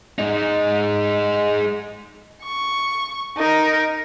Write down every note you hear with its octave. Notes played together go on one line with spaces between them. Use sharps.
G#3 D#4
C#6
D#4 A#4